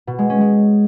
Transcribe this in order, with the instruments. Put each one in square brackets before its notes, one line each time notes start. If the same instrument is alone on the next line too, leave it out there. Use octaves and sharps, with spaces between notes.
[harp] B2
G#3
C#4
G#3